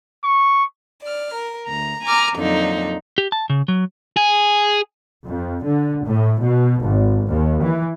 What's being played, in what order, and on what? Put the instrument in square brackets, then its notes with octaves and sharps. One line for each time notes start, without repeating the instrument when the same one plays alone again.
[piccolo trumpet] C#6
[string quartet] D5 F6
A#4
D2 A#5
G#5 A#5 D6 F6
F2 A#2 D3 F#3 D#4
[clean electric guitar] G4
A5
C#3
F#3
[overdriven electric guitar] G#4
[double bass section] F2
D3
A2
B2
G#1
D#2
E3